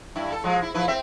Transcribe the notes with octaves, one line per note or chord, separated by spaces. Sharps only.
G2 E4
A4
F3 G#3
E4
F3 E4 B4
C4 E5